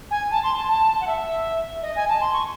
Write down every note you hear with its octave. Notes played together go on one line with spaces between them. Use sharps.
G#5
A5
C6
A5
A5
F#5
E5
D#5
G#5
A5
C6
C#6